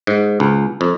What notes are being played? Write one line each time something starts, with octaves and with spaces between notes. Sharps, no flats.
G#2
C#2
F2